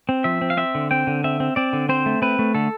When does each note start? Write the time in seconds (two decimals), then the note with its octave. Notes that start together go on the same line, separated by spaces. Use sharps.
0.09 C4
0.24 F3 E5
0.42 C4
0.50 F5
0.57 C4 E5
0.75 D3
0.91 C4 G5
1.07 D3
1.24 C4 E5
1.40 C4
1.56 C4 D5
1.73 D3
1.89 C4 C5
2.06 A3
2.22 C4 B4
2.39 A3
2.54 D3 A4